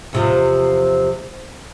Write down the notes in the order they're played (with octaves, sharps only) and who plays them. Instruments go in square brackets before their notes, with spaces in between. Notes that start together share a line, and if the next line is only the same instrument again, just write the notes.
[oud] E2 C3 F3